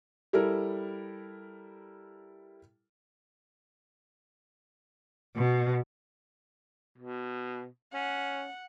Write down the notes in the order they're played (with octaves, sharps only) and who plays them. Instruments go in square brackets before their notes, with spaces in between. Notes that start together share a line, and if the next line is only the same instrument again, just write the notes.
[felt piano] G3 E4 A4 A#4
[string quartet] B2
[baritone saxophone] B2
[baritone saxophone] C#4 [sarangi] F#5